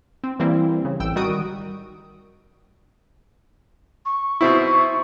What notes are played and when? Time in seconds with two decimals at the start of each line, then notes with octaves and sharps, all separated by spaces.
0.24 C4
0.39 E3 G3 A#3 C4 E4
0.85 C#3
1.00 A1 G5 E6
1.16 D#3 G3 F#4 D#6 D7
4.05 C#6
4.41 B2 C4 E4